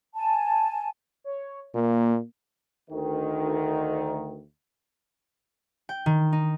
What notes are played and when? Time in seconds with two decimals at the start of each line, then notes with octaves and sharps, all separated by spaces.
0.16 G#5 A5
1.24 C#5
1.75 A#2 A#3
2.91 D2 D#3
5.89 G5
6.06 D#3
6.33 D#4